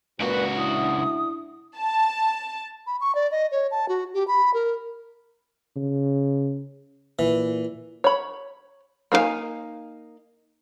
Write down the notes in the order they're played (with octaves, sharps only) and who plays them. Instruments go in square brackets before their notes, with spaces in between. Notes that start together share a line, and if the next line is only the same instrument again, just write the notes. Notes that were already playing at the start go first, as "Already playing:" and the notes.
[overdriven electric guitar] C#2 F#4 [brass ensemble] A#2 [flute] B4
[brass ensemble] D4 E4 [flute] D#6
[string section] A5
[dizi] B5
C#6
D5
D#5
C#5
A5
F#4
G4
B5
A#4
[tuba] C#3
[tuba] A#2 [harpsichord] E3
[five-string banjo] C#5 B5
A#3 D#4 A#4 F5 G#5